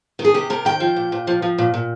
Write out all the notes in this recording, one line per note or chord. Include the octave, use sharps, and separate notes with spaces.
D#3
G#4
C3 G4
C3 A#4
D#3 G5
F3
A#2
A#2
F3
F3
A#2
A#2